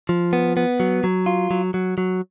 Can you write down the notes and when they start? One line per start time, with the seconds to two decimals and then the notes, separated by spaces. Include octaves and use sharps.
0.09 F3
0.33 B3
0.57 B3
0.80 F#3
1.04 F#3
1.26 F4
1.51 F#3
1.74 F#3
1.98 F#3